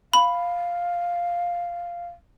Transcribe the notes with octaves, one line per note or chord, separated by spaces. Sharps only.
F5 B5